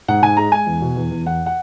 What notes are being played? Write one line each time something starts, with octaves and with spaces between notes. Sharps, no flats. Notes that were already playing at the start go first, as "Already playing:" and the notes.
G#2 F#5
G#2 G#5
G#3 A#5
G#3 G#5
E2
B2
E2
E2
E2 F#5
F#5